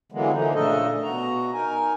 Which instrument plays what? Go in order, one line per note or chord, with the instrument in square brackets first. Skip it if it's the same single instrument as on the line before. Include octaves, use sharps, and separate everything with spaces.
[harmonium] D3 E3 F#3 G#3 A#3 B3
D3 E3 F3 A#3 D#4
A#2 C#3 A3 D4 A4 D#5
B2 F#4 A#5
D#4 A#4 G#5